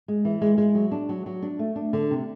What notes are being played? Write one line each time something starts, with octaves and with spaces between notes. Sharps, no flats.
G#3
E3
G#3
G#3
F#3
D4
F#3
F#3
D4
A3
D4
D3
C3